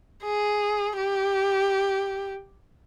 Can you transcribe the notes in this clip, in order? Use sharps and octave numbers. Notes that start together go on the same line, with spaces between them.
G#4
G4